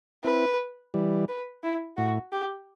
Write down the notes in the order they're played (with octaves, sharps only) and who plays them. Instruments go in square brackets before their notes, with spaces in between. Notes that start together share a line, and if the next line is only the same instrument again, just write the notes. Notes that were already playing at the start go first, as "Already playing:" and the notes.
[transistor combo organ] C4 E4 [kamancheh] B4
[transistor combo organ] E3 G3
[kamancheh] B4
E4
[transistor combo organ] A2 [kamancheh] F#4
[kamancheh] G4